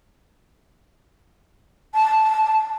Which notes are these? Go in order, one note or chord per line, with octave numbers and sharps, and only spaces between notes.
A5